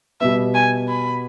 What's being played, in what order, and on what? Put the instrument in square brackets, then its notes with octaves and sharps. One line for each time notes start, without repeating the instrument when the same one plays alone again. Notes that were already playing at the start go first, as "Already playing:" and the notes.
[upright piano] B2 G3 B3 [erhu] E5
[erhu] G#5
B5